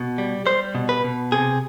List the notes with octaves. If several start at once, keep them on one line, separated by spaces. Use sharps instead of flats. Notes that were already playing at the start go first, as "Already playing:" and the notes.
Already playing: B2
G3
G3 C5
B2
B4
B2
C3 G#4